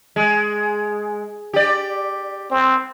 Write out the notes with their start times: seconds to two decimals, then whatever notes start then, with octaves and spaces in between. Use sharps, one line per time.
0.16 G#3
1.53 G4 D5
2.51 C4